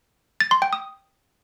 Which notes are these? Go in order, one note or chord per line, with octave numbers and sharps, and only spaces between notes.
A6
C6
G5
D#6